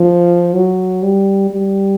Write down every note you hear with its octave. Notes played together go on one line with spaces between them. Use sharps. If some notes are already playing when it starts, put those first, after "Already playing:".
Already playing: F3
F#3
G3
G3